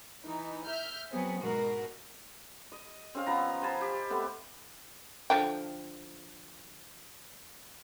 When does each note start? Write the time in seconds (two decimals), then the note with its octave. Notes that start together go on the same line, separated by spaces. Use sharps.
0.24 E3 D#4
0.66 E5 F6 G6
1.11 F#3 B3 C4 G#4
1.42 G#2 B2 F#4 A#4
2.72 D#5
3.14 C4 C#4 G#4 F5
3.26 F3 B3 A#5
3.62 C5 G#5 A5 B5
3.81 G4
4.10 A3 B3 C4
5.30 D3 F3 G5